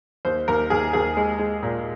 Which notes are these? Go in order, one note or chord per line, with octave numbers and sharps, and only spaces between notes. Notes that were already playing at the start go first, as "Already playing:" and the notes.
D#2 C5
D#2 A#4
D#2 G#4
D#2 G#4
G#3
G#3
A#2